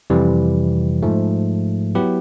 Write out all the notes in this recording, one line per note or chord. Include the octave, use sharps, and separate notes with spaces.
F2 C3 E3 G3
G#2 F3 A3
F#3 B3 E4 G4 B4